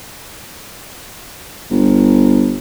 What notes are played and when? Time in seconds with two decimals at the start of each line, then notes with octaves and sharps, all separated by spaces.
1.70 G1